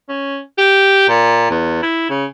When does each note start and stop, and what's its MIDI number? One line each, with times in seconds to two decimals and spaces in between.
0.09 0.39 61
0.58 1.07 67
1.08 1.46 46
1.50 1.79 40
1.82 2.08 64
2.10 2.25 49